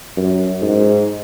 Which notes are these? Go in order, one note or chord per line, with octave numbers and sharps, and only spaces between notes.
F#2
G#2